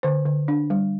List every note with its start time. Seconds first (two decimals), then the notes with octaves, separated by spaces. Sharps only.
0.03 D3 C5
0.26 D3
0.48 D4
0.70 G3